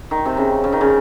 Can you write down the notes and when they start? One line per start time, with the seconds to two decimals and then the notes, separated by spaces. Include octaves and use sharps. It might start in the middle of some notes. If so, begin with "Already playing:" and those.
0.11 D#3
0.25 C3
0.37 C#3
0.64 C#3
0.72 D#3
0.81 C#3